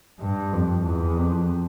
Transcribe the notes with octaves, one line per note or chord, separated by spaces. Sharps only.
G2
F2
E2
F2